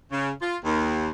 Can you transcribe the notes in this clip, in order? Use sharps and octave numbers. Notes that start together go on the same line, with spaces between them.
C#3
F4
D#2